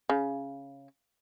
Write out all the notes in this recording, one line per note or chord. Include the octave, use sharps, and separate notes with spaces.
C#3